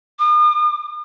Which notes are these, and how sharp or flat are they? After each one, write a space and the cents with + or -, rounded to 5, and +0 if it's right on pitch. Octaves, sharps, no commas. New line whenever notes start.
D#6 -45